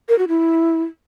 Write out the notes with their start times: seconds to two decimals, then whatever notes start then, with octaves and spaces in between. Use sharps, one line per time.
0.09 A#4
0.18 F#4
0.28 E4